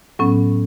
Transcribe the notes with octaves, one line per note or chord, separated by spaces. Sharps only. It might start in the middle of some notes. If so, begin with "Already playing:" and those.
A2 F#3 B3 C#4